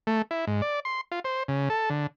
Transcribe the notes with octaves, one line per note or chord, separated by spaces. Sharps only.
A3
E4
G#2
D5
C6
F4
C5
C#3
A4
D3